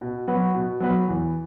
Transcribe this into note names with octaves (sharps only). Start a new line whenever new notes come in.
B2
F#3 B3 F#4 B4
B2
F#3 B3 F#4 B4
E2